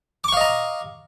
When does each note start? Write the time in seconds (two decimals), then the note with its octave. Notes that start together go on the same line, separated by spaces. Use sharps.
0.24 D6
0.28 C#6
0.33 F5
0.37 D#5
0.41 A#5